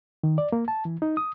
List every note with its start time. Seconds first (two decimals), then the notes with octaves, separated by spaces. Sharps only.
0.23 D#3
0.38 D5
0.52 A#3
0.68 A5
0.85 E3
1.02 D#4
1.17 D#6